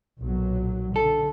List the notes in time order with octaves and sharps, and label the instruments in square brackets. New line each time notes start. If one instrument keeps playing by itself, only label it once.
[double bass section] B1 A#2 F#3
[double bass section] D3 [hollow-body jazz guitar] A4